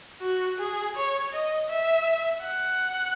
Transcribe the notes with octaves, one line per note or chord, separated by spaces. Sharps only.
F#4
G#4
C#5
D#5
E5
F#5